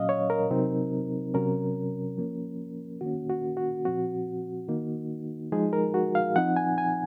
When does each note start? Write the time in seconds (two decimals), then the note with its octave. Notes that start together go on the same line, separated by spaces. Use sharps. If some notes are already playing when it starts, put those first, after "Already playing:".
Already playing: A#2 F#3 C#4 D#5 F5
0.09 C#5
0.30 A#4
0.51 C3 F#3 C4 D#4
1.34 C3 F#3 C#4 A#4
2.17 F3 A#3 C#4
3.01 D#3 A#3 C#4 F#4
3.29 F#4
3.57 F#4
3.85 A#2 F3 C4 F#4
4.68 D#3 A#3 D#4
5.52 F3 G#3 D#4 G#4
5.73 A#4
5.94 F#4
6.15 F5
6.36 F3 C4 D#4 F#5
6.56 G#5
6.78 G#5